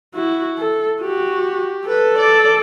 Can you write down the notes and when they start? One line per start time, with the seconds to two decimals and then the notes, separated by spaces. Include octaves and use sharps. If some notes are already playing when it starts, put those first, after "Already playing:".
0.14 E4 F#4
0.58 A4
1.01 F#4 G4
1.88 A4 B4
2.17 D5